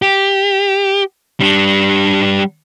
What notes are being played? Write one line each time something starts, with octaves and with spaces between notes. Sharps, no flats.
G4
G3 D4